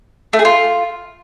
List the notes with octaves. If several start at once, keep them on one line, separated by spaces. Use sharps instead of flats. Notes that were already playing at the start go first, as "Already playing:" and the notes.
A3
G#4
F4